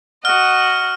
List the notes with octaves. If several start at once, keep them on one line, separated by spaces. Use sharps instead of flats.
F#4 D#5 F#5 F6